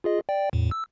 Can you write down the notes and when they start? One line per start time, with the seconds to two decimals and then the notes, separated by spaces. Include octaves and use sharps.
0.04 F4 G#4 D#5
0.29 D5 G5
0.53 E2 A2
0.71 E6